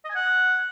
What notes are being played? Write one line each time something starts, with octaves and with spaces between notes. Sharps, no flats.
D#5
G#5
F#5